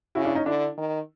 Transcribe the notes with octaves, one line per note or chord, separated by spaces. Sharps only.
C#3 E4 F#4
D4 E4
C#4 D#4
D3 D4 E4
D#3